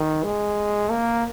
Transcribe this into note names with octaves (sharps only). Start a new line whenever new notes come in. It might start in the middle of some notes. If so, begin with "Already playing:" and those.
Already playing: D#3
G#3
A#3